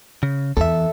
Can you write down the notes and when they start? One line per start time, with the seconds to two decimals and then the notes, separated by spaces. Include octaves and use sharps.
0.23 C#3
0.57 E2 A4 E5